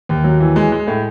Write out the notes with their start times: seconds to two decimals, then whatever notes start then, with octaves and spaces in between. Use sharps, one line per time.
0.09 D#2
0.24 F#3
0.40 E3
0.56 G#3
0.72 G#3
0.87 A2